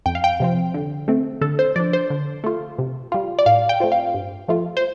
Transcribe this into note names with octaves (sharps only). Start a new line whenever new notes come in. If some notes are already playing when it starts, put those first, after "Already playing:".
F2 G5
F5
G5
C3 F3 C4
D3
A3 C4
D3 A4
C5
F3 D4 D5
C5
D3
A3 F4
C3
G3 F4
D5
A2 F5
G5
A3 C4 F4
F5
G2
F3 A3 F4
C5